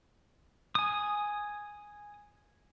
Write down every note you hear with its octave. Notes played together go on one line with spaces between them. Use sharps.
G#5 D#6